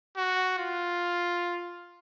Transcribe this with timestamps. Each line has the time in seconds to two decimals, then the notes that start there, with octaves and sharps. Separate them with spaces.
0.17 F#4
0.59 F4